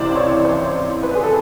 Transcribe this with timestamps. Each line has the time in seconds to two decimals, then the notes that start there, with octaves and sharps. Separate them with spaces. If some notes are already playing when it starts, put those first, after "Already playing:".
Already playing: C#2 C3 E3 C5 D5
0.16 C#5
0.45 C5
1.03 B4
1.15 G#4
1.23 A4